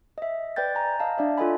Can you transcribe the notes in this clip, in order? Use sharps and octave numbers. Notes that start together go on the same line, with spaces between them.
D#5 E5
B4 D5 G5 G6 A6
G#5 A#5
D#5 F5 A5
D4 D5 E5
F4 A4 D#5 G#5 B5